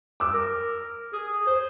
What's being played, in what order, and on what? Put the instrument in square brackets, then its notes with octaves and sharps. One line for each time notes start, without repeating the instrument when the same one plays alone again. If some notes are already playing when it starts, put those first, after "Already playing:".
[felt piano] D6 E6
[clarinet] A#4
G#4
C5